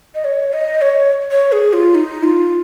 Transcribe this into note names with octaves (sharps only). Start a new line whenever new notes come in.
D#5
C#5
D#5
C#5
C#5
G#4
F4
D#4
F4